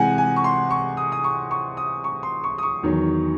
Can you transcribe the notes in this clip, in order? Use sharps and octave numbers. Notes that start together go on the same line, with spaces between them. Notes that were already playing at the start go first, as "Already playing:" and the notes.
Already playing: C3 E3 G#3 F#5 G#5
G#5
C#6
C6
C#6
D#6
D#6
C#6
C#6
D#6
C#6
C6
C#6
D#6
C#6
E2 D#3 F#3